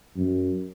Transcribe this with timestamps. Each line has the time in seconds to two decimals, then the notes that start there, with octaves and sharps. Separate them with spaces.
0.17 F#2